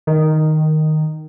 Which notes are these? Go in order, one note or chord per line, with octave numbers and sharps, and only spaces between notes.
D#3